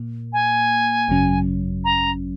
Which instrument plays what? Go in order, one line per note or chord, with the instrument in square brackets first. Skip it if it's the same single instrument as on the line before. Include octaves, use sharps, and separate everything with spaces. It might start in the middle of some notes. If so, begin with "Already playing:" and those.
Already playing: [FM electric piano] A#2 A#3
[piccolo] G#5
[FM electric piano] G#1 F#2 C#3 F#3 C#4
[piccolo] A#5